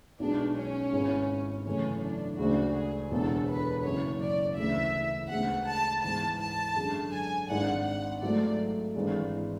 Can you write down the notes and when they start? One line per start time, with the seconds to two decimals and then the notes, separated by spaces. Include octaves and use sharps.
0.19 B1 B2 G#3 D4
0.57 C#4
0.93 G#1 G#2 G#3 B3 E4
1.65 F#2 C#3 E3 A3 C#4
2.03 D4
2.38 D2 C#3 G#3 D4 F#4
2.75 G#4
3.11 E1 E2 D3 A4
3.48 B4
3.84 F#1 F#2 C#3 C#5
4.21 D5
4.57 D2 C#3 E3 E5
5.30 D2 C#3 G#3 B3 F#5
5.67 A5
6.04 G#2 E3 B3 A5
6.40 A5
6.76 F#2 D3 G#3
7.13 G#5
7.48 G#1 G#2 G#3 D4 F#5
7.86 F#5
8.22 G#2 F#3 A3 D5
8.95 G#1 G#2 E3 G#3 D4